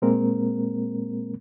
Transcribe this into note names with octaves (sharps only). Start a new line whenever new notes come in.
A#2 G#3 A#3 C4 A#4